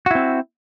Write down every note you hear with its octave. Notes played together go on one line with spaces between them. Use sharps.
C4 E4 F#4